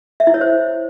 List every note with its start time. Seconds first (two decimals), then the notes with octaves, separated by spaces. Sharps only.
0.20 E5
0.27 E4
0.34 C#5
0.41 C5